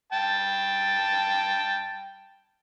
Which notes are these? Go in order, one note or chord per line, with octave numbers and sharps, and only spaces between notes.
G5 A5